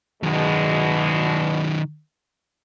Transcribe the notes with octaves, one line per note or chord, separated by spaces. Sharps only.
E2 B2 D#3 F#3 G#3